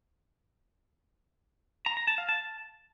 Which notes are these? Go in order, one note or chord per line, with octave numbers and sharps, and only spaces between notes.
A#5
A#5
A5
F5
A5